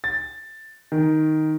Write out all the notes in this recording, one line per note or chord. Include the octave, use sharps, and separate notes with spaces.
A6
D#3